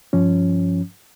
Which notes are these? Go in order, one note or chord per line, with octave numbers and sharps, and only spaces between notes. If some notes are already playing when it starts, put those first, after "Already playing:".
G2 F3 C#4